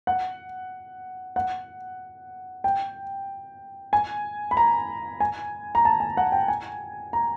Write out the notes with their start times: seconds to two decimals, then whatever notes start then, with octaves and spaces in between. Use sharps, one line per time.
0.07 F#5
1.36 F#5
2.64 G5
3.93 G#5
4.51 B5
4.57 A#5
5.20 G#5
5.75 A#5
5.85 A5
6.00 G#5
6.17 F#5
6.32 G5
6.48 G#5
7.13 A#5